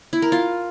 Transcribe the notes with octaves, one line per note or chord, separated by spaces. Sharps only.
E4
A#4
F4